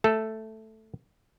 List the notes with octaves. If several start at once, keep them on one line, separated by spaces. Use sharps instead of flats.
A3 A4